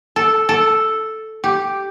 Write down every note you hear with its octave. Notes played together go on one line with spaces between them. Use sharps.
A4
A4
G4